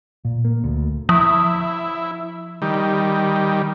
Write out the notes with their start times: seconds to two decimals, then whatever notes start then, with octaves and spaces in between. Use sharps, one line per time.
0.25 A#2
0.45 A#3
0.64 D2
1.09 F3 E4
2.62 D#3 G3